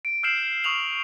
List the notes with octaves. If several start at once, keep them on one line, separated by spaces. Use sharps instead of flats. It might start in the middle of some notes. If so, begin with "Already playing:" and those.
D7
E6 F6 G6 C7 E7 F#7
C#6 D#6 F6 F7 F#7